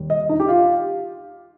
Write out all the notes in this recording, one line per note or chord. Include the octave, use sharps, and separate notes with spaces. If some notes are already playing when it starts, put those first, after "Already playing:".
Already playing: D#2 G3
D#5
D#4
G4
F4